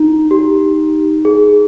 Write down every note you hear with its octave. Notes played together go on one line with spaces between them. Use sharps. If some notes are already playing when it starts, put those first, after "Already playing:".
Already playing: D#4
G4
G#4